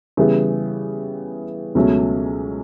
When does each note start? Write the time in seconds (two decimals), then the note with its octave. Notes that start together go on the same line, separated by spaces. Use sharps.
0.17 C#3 E3 G3 B3 E4
1.75 C#2 B2 F#3 A3 C#4